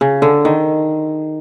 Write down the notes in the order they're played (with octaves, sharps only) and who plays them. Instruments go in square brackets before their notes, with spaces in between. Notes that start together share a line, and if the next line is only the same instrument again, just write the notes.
[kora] C#3
D3
D#3